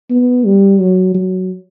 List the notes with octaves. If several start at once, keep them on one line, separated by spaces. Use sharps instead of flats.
B3
G3
F#3
F#3